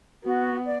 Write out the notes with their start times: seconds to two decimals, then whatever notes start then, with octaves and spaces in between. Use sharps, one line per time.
0.24 B3 F#4
0.65 D5